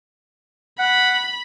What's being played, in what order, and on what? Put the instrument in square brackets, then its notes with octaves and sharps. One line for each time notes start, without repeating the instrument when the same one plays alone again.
[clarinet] F#5 [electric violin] B5